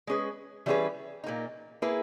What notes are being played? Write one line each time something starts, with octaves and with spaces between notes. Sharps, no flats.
G#3 C#4 G#4 B4
E3 G3 C#4 G#4 B4
A#2 A#3 D#4
A#3 E4 G#4 B4